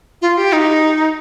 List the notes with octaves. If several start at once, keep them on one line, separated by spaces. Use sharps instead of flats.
F4
G4
D#4